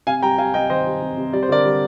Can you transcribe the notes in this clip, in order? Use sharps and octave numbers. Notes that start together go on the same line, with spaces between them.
C3 F5 G#5
G3 G5 A#5
G3 F5 G#5
C3 D#5 G5
D#3 C5 D#5
G3
C3
C3
G3 D5
C5
D3 A#4 D5
G3